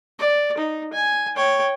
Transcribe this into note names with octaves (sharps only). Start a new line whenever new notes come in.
D5
D#4
G#5
C#5 G5